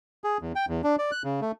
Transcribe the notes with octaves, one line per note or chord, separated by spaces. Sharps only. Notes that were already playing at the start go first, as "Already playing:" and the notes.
G#4
E2
G5
E2
D4
D5
F#6
C#3
A3